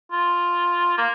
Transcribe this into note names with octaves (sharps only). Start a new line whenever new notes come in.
F4
A#3